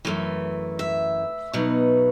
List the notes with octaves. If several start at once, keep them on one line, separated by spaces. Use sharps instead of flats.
F#2 E3 A3
E5
B2 F#3 B3 D#4